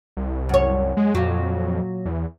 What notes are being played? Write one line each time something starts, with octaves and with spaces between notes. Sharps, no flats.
C2
F#2 C#5
G#3
F2 A#2 F#3
E2